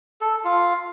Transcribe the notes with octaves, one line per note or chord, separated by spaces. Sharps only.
A4
F4